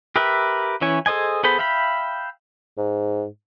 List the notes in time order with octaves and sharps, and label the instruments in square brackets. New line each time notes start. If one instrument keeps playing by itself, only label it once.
[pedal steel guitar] G4 A#4 B4 E5
E3 C#4 E4 C#5 G#5
G#4 A4 C5 D#5 G#5
B3 G#4 A4 C5 B5
E5 F5 G5 B5
[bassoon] G#2